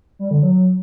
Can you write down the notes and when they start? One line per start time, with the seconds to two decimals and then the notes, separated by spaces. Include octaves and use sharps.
0.19 G3
0.31 D3
0.43 F#3